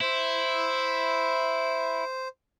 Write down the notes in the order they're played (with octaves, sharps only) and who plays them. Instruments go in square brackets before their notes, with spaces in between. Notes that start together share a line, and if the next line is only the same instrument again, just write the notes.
[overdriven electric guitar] E4 [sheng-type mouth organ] C5